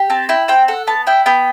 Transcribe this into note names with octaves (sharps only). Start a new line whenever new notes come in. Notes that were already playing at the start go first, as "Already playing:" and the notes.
Already playing: G4
C4 A5
E4 G5
C4 G5
A4 F#5
B3 A5
E4 G5
B3 G5